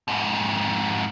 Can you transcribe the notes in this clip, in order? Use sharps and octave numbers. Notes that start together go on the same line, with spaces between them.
F2 G#2